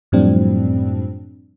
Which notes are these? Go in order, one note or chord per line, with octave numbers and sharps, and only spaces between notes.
F#2 A2 F3 G3 C4 D4